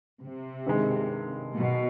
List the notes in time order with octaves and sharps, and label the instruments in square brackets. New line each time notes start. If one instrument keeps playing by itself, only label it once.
[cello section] C3
[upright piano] G2 D#3 G#3
[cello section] B2